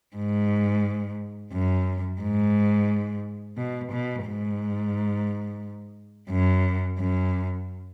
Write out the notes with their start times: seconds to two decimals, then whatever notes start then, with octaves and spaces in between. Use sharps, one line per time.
0.16 G#2
1.53 F#2
2.21 G#2
3.58 B2
3.92 B2
4.26 G#2
6.31 F#2
6.99 F#2